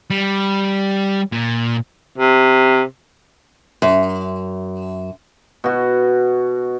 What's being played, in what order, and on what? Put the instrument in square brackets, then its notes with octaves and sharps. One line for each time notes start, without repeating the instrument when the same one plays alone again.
[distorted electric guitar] G3
A#2
[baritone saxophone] C3
[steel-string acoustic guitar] F#2
[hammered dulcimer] B2 F#4